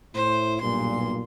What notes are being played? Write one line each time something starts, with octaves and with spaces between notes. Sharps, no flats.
A2 E4 C5
B1 G2 A#2 C6